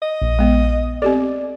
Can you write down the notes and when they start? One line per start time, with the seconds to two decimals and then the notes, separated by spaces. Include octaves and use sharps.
0.02 D#5
0.22 A#1
0.39 G#3 B3
1.02 C4 G4 A4 D5